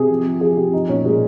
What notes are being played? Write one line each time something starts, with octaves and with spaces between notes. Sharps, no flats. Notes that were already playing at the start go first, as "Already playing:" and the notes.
Already playing: C3 G#4
F3
F3
F3 G#4
C3 G4
F3 D#4
A#2 C#4
A#2 G#3